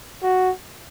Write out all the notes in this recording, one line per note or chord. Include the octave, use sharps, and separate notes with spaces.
F#4